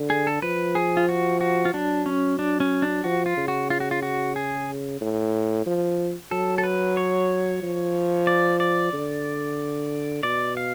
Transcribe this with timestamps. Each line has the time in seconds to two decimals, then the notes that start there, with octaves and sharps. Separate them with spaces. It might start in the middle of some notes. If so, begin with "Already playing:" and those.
Already playing: D3
0.10 G#4
0.27 A4
0.42 F3 B4
0.75 G#4
0.97 F4
1.09 F#4
1.41 F#4
1.65 F4
1.74 F#3 D4
2.06 C#4
2.39 D4
2.60 C#4
2.82 D4
3.04 F3 F#4
3.26 F4
3.37 C#3
3.48 F#4
3.70 F4
3.80 F#4
3.91 F4
4.03 F#4
4.36 G#4
5.01 A2
5.66 F3
6.31 F#3 A4
6.58 A4
6.64 B4
6.97 C#5
7.62 F3
8.27 D5
8.60 D5
8.93 D3
10.23 B2 D5
10.57 F5